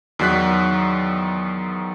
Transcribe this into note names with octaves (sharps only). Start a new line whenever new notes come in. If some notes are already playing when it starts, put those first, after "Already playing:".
E2 D#3 F#3 D5 F#6 B6